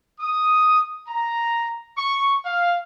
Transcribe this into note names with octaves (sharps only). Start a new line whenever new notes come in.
D#6
A#5
C#6
F5